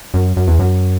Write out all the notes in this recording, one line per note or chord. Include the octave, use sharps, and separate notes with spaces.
F#2
F#2
E2
F#2